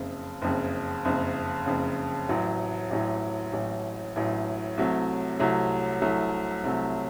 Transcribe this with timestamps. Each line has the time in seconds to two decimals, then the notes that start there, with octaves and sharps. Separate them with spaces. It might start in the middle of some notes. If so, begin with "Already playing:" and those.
Already playing: F#1 F2 C#3
0.42 F#1 F2 C#3
1.05 F#1 F2 C#3
1.66 F#1 F2 C#3
2.29 A1 A2 F#3
2.90 A1 A2 F#3
3.53 A1 A2 F#3
4.16 A1 A2 F#3
4.77 C2 C3 F#3 A3
5.39 C2 C3 F#3 A3
6.02 C2 C3 F#3 A3
6.64 C2 C3 F#3 A3